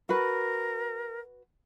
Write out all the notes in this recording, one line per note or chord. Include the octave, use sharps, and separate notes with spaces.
F#4 A#4 B4